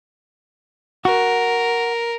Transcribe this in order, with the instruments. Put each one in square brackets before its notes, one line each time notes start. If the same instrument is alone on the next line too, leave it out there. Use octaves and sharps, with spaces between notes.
[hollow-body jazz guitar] F#4 [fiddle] A#4